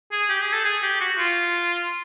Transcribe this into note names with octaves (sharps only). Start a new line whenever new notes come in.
G#4
G4
G#4
A4
G#4
G4
F#4
F4